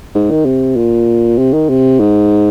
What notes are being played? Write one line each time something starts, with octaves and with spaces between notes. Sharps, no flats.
G#2
D#3
C3
A#2
C3
D#3
C3
G#2